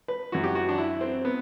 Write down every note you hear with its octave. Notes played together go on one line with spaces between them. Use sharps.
B4
F#2 E3 F#4
G4
F#4
D4
E4
C4
B3